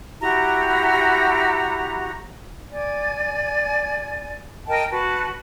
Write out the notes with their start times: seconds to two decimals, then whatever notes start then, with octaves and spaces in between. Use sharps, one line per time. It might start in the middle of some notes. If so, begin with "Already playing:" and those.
0.21 E4 F#4 G4 A#5
2.71 D5 G#5
4.67 A#4 D#5 G5 A5
4.91 F#4 B4 A5